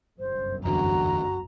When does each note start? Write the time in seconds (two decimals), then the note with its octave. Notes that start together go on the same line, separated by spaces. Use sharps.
0.19 G1 C2 F#2 C5
0.65 E2 D3 F#4 A#5